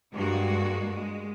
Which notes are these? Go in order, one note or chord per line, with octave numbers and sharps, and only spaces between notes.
G2 G#3 A#3 F#4
G#3